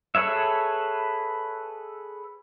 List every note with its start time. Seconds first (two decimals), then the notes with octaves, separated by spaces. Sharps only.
0.15 G#4 A4 B4 C#5 E5